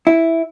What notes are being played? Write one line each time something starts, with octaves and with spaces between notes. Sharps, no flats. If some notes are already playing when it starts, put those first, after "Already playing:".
E4